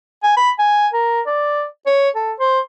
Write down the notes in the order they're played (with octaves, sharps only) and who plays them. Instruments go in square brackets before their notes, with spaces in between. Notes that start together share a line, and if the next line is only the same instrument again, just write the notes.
[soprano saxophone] G#5
B5
G#5
A#4
D5
C#5
A4
C5